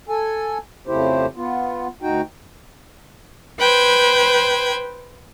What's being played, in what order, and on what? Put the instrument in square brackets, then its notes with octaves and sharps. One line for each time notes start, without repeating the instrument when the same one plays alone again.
[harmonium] A4 G#5
F2 C#3 A3 E4 G4 C5
B3 F4
D2 D#4 F#4 G5
[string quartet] B4 C5 G5 G#6